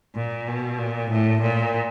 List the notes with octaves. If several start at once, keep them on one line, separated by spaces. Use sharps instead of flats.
A#2
B2
A#2
A2
A#2